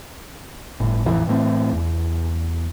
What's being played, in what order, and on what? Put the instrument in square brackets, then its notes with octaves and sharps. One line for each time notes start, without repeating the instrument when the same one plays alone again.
[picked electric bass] G1 A2
D#1 A1 F2 E3
A2 E3 A3 C4
E2